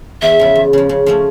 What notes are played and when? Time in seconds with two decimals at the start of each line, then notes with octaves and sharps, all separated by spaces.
0.22 E2 E5
0.39 C#3 F3
0.56 E2
0.73 C#3 F3
0.89 C#3
1.06 F3 A3 C#4